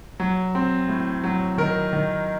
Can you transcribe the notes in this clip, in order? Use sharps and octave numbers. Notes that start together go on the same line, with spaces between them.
F#3
C4
A2
F#3
D#3 A#4
D#3